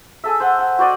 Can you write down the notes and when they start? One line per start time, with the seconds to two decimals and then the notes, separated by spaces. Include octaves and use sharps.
0.24 G#4 A4 E5
0.40 C5 F#5
0.59 F#5
0.79 F#4 C5 D5 D#5